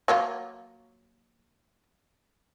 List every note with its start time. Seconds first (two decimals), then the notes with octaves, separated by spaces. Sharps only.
0.08 F#3 A#3 F4